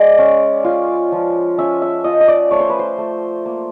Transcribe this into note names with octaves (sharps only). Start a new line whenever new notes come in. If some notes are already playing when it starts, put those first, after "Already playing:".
Already playing: G#3 D5
C#4
F4
F3
C#4 E5
E5
F4 D#5
D#5
D5
A3 C#5
C5
B4
C5
A3
A#3